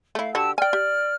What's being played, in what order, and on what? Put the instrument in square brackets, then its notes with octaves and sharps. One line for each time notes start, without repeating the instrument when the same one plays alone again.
[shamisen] A3 E4 [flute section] F5
[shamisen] D3 F#4 [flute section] G4 A5 E6
[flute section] D5 F6 [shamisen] G5 G#5
[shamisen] G4